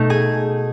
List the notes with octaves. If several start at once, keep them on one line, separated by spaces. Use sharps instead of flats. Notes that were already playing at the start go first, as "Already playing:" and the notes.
Already playing: B2 A3 D#4
G#4 G#5